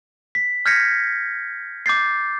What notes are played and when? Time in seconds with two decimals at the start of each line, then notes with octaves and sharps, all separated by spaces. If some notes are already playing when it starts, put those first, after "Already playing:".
0.35 B6
0.66 F6 G6 G#6 A#6 B6 C#7
1.86 D6 G6 A6 C7